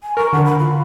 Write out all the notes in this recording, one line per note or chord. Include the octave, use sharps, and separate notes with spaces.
G#5
A#4 C#6
D3 F#5
B5
F4